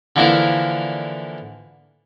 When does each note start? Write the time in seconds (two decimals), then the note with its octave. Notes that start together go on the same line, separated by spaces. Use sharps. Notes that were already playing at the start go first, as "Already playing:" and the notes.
0.16 D3 E3 F3 A#3 E4 A#4